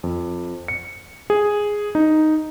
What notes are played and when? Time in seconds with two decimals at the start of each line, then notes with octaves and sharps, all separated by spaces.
0.04 F2
0.68 C#7
1.30 G#4
1.95 D#4